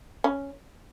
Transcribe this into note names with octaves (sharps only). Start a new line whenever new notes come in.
C#4